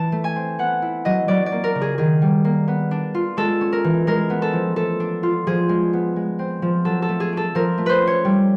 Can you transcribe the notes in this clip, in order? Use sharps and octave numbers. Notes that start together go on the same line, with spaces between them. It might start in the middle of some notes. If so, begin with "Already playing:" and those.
Already playing: E3 A5
A3
G#5
C4
B3 F#5
E4
F#3 D#5
F#3 D5
D5
A#3
A#4
C#3
G#4
D#3 G#4
G3
A#3
B3
D4
F4
G#3 A4
C#4
A#4
E3
G#3 A#4
B3
A4
F3
A3 A4
D4
F4
F3 G#4
G#3
B3
G#3
C4
F3
F#3 A4
A4
A3
G#4
D4 A4
F3 A#4
A3
B4 C5
C#4
C#5
G3